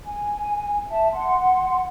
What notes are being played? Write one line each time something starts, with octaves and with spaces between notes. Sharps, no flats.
G#5
E5 A5
F#5 C6